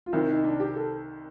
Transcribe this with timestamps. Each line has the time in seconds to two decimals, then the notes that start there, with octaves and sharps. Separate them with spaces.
0.06 F4
0.13 C2 C3 D#3 E4
0.29 D#4
0.44 D4
0.60 G4
0.76 A4